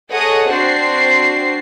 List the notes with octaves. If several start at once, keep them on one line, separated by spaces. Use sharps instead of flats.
G#4 A4 C#5 D#5 F#5 D#6
C4 D4 F#4 C5 C7